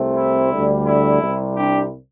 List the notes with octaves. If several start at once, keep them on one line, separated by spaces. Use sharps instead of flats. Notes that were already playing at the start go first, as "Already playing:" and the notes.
Already playing: C2 C3 A3 C4
E4
D2 D3 G3
E4
C2 C3 G3
D4 G4